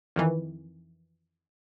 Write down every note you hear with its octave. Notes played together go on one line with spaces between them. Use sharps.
F2 D#3 E3